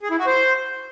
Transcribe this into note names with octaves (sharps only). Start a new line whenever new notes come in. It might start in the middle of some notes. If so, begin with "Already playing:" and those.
G#4
E4
F#4
C5